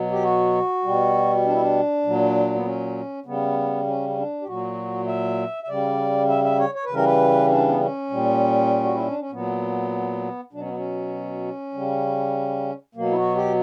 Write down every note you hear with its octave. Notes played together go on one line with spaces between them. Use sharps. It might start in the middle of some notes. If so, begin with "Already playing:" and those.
Already playing: B2 F#3
G4
F#4
B2 G3
D4
E4
D4
A#2 F#3
B3
C#4
C#3 G3 B3
C#4
C#4
D4
G4
A#2 F#3 F#4
E5
E5
C#3 G3 D5
E5
E5
C#5
C#5
B4
C#3 E3 G3 A#4
B4
D4
B3
C#4
A#2 G3
F#4
E4
D4
C#4
A#2 F#3 B3
B2 F#3 D4
C#4
B3
C#4
C#3 G3
B2 F#3 A#3
E4
F#4
G4